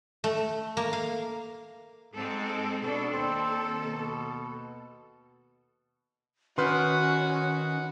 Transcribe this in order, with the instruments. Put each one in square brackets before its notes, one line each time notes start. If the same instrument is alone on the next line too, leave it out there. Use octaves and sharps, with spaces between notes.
[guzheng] A3
A#3
F5
[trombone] G#2 [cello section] G#3 C4 A4
[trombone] B2 [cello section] D4 A4
[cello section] D#2 A4 [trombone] C4
[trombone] B2
[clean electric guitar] D#3 [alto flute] C#4 [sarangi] F#4 [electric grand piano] B4 C6